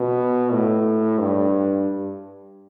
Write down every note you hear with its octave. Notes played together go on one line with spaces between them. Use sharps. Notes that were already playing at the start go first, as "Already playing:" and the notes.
Already playing: B2
A2
G2